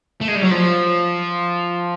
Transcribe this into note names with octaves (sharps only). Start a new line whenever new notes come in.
A3
G#3
G3
F#3
F3